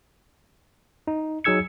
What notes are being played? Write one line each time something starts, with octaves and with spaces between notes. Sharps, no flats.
D#4
F#3 D#4 G#4 E6 G#6 C#7